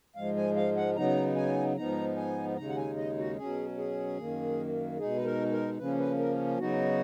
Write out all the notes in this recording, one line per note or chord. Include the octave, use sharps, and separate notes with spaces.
G#2 F3 G#3 F5
G#5
F5
F#5
C#3 F#3 B3 D#4 A#5
G#5
G#2 F3 B3 D#4 A#5
G#5
D#2 C#3 G#3 D#4 A#5
F#5
G#5
D#5
F#4
B2 F#3 C#4 G#4
G#4
F#2 D#3 A#3
B2 G#3 D#4 G#4
B4
A#4
A#4
C#3 F3 A#3 C#4 B4
B4
A#4
C#3 F#3 B3 D#4 F#4